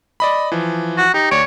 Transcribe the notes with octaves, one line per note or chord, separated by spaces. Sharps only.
D5 D#5 B5
E3 F3
F#4
D#4 G4
D2 C#5 D5 D7